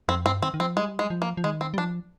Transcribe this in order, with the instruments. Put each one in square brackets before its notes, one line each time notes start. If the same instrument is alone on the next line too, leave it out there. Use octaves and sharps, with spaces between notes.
[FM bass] F2 [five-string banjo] C4
[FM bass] G2 [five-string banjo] C4
[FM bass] D#3 [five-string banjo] C4
[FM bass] D#3
[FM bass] F3 [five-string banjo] C4
[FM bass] G3 [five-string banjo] G#3
[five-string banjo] G#3
[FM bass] F3
[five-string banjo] A#3
[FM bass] F3
[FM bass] D#3 [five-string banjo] G#3
[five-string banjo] C4
[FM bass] G3
[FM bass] F3 [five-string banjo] D4